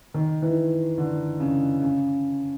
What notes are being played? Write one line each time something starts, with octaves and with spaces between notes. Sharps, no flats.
D#3
E3
D3
C#3
C#3